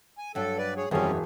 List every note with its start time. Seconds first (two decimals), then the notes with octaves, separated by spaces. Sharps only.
0.18 G#5
0.35 G2 F#3 D4 A4
0.58 B4 D5
0.77 G#4 C#5
0.91 E1 F#2 G3 C4 C#4 G#4 A#4 C#5